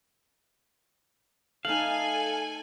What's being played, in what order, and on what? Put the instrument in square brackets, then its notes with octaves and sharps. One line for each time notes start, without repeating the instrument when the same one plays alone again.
[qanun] A3 D#4 [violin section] A4 G#5 [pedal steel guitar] F5 [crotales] F#7